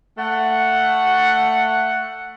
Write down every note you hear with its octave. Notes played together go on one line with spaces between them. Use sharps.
A3 F#5